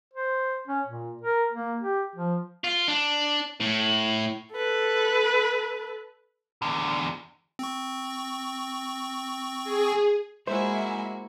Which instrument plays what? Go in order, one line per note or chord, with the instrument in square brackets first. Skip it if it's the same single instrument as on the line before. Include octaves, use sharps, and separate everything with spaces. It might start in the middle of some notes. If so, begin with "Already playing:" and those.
[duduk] C5
C#4
A#2
A#4
A#3
G4
F3
[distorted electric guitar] F4
D4
A2
[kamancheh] A4 B4
[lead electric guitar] E2 D3
[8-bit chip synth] C4 C#6
[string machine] G#4
[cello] G#3 [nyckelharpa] A#3 F#4 [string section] E4 E5 G#5 [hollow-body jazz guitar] C5